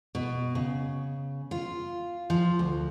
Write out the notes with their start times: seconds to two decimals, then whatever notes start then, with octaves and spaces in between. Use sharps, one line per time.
0.15 B2
0.55 C#3
1.51 F4
2.30 F3
2.59 D2